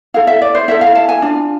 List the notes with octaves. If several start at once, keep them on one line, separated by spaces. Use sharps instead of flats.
E4 A4 F5
E5
D5
C5
E4 A4 E5
F5
A5
G#5
D4 F4